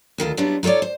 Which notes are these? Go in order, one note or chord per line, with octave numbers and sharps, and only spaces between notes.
D2 D#3 F4 A4
F#3 G3 B3 D4 E4 F4
D#4 F4 A4 C#5 D5
C5